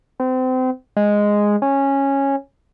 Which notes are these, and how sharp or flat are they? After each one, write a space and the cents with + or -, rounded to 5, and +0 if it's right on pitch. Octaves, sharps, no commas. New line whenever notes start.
C4 -30
G#3 -5
C#4 -10